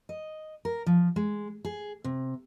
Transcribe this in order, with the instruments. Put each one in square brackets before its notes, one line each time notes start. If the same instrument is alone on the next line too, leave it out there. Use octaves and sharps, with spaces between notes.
[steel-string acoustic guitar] D#5
A#4
F3
G#3
G#4
C3